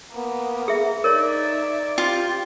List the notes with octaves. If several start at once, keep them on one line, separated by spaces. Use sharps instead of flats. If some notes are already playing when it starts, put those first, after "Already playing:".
A#3 B3
G#4 E5
D#4 A#4 C#5 D5 E5
C4 F4 G4